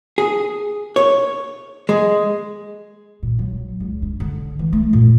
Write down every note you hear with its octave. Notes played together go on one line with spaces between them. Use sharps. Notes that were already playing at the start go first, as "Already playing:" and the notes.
G#4
C#5
G#3
A#2
F#3
C#2
D4
D3
E3
A3
A#2